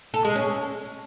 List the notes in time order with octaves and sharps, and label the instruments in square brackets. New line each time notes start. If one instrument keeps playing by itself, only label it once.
[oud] A4
G#3
C#4